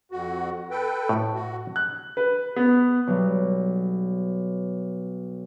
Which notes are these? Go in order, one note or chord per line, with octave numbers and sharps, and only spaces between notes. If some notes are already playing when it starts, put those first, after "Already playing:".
F2 F#4
A4 B4 G5
A2
F#4
F#6
B4
B3
B1 G3